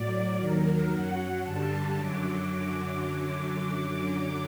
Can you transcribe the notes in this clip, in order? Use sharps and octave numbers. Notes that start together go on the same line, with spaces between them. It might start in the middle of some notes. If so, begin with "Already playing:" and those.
Already playing: A2 F#3 D5
D#2 D#3 F#3 A#4
F#2 F#3 F#5
G2 D3 G3 A5
F#2 D3 F#3 D6